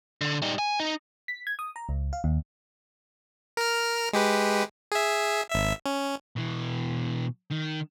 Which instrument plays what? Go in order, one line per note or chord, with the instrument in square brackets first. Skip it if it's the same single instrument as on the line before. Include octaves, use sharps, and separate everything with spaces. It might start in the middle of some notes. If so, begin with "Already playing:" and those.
[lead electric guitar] D3
G3 D#4
G#5
D#4
[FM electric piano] B6
G#6
D#6
A#5
C#2
F5
D#2
[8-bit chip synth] A#4 F6
G#3 G4 B4
G#4 E5
G#1 E5
C#4
[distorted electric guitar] B2 E3
D#3